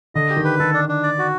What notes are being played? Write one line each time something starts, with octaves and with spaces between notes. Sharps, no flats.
D3 D#5
G4
D#3
B4
D#3 A4
D4
D4
D5
F#4